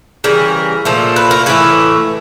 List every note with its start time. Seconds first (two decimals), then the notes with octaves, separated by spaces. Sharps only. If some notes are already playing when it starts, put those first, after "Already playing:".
0.24 C#3 E3 G3 A#4
0.85 A#2 F3 A3
1.16 B4
1.31 A#4
1.46 A2 E3 A3 B4